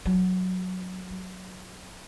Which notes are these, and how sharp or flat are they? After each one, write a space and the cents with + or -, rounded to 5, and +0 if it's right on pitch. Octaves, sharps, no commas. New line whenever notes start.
F#3 -5
F#3 +0